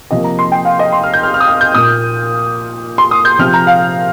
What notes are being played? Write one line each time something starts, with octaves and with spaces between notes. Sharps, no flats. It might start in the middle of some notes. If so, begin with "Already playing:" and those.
C3 F3 A#3 D#5
A#5
C6
G5
F5
D#5
C6
F6
G6
F6
F6
D#6
F6
G6
A#2 A#3 D#6
C6
D#6
G6
C3 F3 C4 F6
A#5
F5